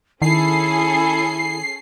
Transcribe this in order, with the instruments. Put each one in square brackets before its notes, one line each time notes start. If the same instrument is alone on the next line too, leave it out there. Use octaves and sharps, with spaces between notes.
[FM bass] D#3 [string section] C#4 G#4 A4 [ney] E4 [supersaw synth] C7